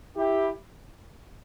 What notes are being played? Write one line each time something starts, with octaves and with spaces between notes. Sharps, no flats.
E4 G4